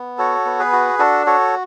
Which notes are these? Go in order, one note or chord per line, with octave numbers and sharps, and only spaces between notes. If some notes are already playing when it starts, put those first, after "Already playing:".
Already playing: B3
F#4 A4 C#5
B3
G#4 B4
F#4
D4 F#4 A4
F#4 A4 C#5